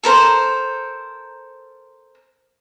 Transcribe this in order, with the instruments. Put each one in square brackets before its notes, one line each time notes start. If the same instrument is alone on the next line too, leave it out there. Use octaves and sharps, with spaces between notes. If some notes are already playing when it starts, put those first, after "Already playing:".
[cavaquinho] A4 A#4 C5